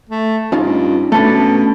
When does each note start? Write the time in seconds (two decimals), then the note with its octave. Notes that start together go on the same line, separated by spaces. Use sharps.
0.09 A3
0.52 G2 C#4 D#4 F4
1.12 B2 A3 C#4 D4 A4 B4